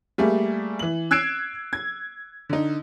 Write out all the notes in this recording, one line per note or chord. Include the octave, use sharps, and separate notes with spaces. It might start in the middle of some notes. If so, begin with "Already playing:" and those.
G3 A3 A#3 G#4
E3 F#7
E6 F#6 G#6 C7 D7 E7
G#6
D3 D#4